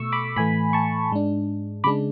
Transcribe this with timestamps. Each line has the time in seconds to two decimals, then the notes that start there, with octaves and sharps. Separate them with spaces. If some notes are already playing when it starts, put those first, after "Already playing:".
Already playing: B2 A3 C#6 E6
0.12 B5 D6
0.36 A2 E3 A3 G#5 B5
0.73 A5 C#6
1.11 G#2 G#3 D4
1.84 C#3 G#3 D4 B5 D6